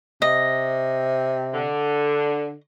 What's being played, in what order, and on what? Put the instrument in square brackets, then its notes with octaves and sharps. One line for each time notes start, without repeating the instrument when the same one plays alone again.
[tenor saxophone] C3 [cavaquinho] D#5
[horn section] D3